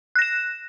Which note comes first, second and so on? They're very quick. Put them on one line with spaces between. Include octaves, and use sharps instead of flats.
F#6 A#6 E7